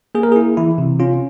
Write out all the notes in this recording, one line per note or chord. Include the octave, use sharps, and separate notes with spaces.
A#3 G#4
A#4
G#4
E4
E3 E4
C3
C#4 F4